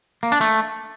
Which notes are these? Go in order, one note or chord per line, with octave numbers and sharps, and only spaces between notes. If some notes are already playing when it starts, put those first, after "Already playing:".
A#3
D4
A3